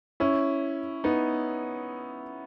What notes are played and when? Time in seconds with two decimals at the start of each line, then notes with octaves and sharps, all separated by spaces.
0.20 C#4 E4
1.04 B3 D#4